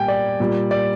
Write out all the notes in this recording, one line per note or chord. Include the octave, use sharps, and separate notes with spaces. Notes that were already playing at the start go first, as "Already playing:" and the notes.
Already playing: A#2 G3 G5 G#5
D5
A#2 G3
D5